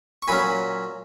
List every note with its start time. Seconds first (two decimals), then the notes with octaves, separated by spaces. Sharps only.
0.22 C#6
0.28 A#2 F#3 C#4 G#5 B5